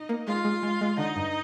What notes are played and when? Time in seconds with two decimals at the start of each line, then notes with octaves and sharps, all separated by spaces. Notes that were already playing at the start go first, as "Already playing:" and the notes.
Already playing: D#4 D#5
0.09 A#3
0.27 G#3 F4 F5
0.45 G#3
0.63 G#3
0.81 G#3
0.98 D3 D#4 D#5
1.16 G2